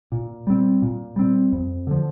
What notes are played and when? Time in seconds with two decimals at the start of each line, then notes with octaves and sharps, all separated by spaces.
0.12 A#2
0.47 G3 C4
0.82 A#2
1.16 G3 C4
1.52 F2
1.87 D3 F3